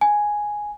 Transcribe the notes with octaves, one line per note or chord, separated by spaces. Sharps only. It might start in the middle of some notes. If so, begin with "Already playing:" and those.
G#5